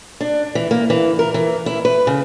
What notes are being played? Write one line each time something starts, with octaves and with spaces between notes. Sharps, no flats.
D4
E3
A#3
E3
A#4
E3
E4
B4
C#3